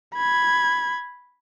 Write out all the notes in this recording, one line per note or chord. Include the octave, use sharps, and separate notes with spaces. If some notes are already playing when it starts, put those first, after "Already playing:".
B5 G#6